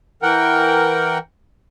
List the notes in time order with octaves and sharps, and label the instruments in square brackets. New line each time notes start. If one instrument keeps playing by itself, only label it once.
[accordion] E3 A#4 F#5 G5